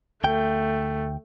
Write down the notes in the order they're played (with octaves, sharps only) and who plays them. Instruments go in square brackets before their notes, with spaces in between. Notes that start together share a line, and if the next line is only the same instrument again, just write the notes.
[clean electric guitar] D2 G5 [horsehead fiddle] A3